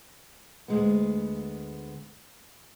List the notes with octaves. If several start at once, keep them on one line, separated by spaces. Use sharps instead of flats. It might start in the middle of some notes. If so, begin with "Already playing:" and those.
D2 G#3 B3